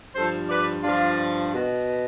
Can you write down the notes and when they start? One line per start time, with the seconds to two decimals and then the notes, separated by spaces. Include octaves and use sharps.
0.15 G2 F3 A4 C5
0.50 B4 D5
0.83 G2 F3 D4 F4
1.52 B2